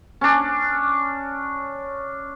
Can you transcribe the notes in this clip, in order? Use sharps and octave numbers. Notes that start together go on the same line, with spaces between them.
C#4 D4